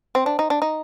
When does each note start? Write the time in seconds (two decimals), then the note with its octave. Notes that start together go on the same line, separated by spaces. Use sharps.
0.15 C4
0.26 D4
0.39 D#4
0.50 D4
0.62 D#4